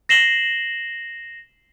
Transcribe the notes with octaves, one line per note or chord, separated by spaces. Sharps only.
A#6 C7 E7 F#7 G7